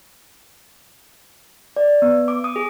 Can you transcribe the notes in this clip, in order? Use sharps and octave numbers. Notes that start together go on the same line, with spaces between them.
D5
B3
D6
D#6
G#4